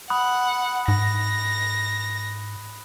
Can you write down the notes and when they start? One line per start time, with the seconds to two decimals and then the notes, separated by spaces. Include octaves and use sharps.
0.10 F#5 B5 D#6 F#6
0.88 G#2 A#6